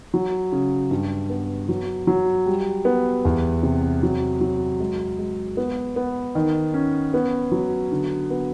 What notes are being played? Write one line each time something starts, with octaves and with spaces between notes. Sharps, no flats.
F#3
C#3
G2
B3
F#3
F#3
G3
B3
E2
C3
F#3
F#3
G#3
G#3
B3
B3
D#3
C#4
B3
F#3
D3
B3